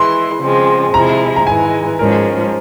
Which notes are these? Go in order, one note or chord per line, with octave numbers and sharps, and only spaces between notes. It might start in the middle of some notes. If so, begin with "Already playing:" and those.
Already playing: E3 G#3 E4 C6
C#3 F3 G#3 C4
C3 F3 G#3 E4 A#5
A#5
G#2 E3 G#3 G#5
G#2 F3 G#3 C#4 A#4